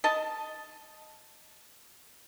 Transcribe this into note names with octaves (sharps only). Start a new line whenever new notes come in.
D#5 A5